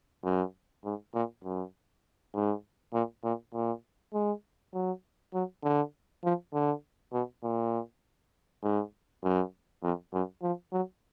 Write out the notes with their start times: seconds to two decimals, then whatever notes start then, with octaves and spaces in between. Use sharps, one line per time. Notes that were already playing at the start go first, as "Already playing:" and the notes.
0.24 F#2
0.85 G#2
1.14 A#2
1.44 F#2
2.34 G#2
2.93 A#2
3.24 A#2
3.54 A#2
4.14 G#3
4.73 F#3
5.34 F#3
5.63 D3
6.24 F3
6.53 D3
7.13 B2
7.43 A#2
8.63 G#2
9.23 F#2
9.83 F2
10.13 F#2
10.42 F3
10.72 F#3